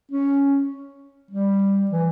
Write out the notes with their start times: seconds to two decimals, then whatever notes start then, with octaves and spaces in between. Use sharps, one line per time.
0.12 C#4
1.31 G3
1.91 E3